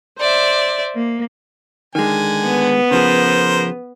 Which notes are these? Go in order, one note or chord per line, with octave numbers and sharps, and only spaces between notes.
C5 D5 E5
A#3
D3 D#3 G#3 G#5
B3
C#3 F3 G#4 A#4 C5